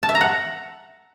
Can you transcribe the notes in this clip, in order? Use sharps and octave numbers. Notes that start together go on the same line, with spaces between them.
A5
E5
A#5
F#5